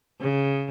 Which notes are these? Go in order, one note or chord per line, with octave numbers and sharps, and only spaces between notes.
C#3